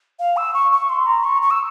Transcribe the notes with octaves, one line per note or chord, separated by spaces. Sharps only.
F5
E6
C#6
C#6
C6
A#5
C#6
C#6
E6